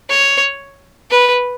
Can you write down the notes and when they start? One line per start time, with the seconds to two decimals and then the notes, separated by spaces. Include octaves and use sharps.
0.09 C#5
1.11 B4